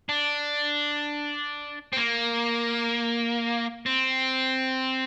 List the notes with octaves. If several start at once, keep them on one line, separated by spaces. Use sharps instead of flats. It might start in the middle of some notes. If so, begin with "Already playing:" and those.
D4
C4
A#3
C4